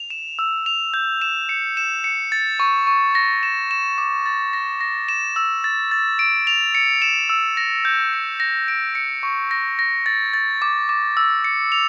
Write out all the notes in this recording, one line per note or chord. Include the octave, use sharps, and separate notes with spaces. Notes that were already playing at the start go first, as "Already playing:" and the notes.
Already playing: F7
E7
E6
F7
G6
E7
C#7
E7
C#7
A6
C#6
C#6
A#6
E7
E7
D6
A6
A#6
A#6
E7
E6
A6
A6
D7
F7
C#7
E7
E6
A#6
G6
C#7
A#6
D7
C#7
C#6
A#6
A#6
A6
A6
D6
D6
E6
C#7
F7